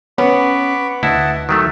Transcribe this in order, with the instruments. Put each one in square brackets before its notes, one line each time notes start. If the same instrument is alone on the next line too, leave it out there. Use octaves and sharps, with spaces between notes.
[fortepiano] B3 [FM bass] C#4 [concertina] B5 C#6 D6
[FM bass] D2 [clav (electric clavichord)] E4 [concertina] D#5 F#5 A5
[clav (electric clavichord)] D#3 F#3 A3 [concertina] E5